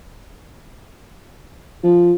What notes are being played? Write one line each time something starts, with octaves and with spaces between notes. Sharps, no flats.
F3